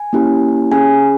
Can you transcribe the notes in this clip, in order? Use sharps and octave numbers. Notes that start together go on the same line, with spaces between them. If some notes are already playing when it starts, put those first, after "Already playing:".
Already playing: G#5
A#3 C#4 E4 G4
C#4 G#4 G#5